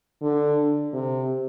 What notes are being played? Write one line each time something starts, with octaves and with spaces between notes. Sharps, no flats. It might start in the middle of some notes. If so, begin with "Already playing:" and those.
D3
C3